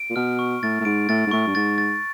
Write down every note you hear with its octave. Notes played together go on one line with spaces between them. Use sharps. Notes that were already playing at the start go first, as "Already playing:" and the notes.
Already playing: D7
A#2
B2 F6
C#6
A2 A6
A2
G#2 D7
A2 A6
G#2
A2 C#6
G2
G#2 A6
A6